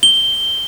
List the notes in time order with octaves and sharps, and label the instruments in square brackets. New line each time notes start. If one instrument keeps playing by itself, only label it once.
[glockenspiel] G7